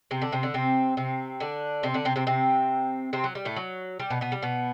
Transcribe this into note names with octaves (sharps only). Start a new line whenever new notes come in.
C3 C4
D3 D4
C3 C4
D3 D4
C3 C4
C3 C4
D3 D4
C3 C4
D3 D4
C3 C4
C3 C4
C3 C4
C3 C4
F#3
G3
A2 A3
F#3
G3
B2 B3
B2 B3
G3
B2 B3